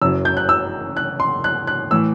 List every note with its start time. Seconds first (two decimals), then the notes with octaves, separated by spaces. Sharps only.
0.02 F#1 F#2 F#3 E6
0.25 G6
0.37 F#6
0.49 E6
0.97 F#6
1.20 C6
1.44 F#6
1.67 F#6
1.91 A2 E3 E6